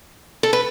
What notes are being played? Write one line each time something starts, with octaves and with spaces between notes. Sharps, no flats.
A4
B4